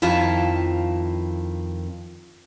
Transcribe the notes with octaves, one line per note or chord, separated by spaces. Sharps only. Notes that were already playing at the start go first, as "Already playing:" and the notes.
F2 D#3 E4 F4 F5 A5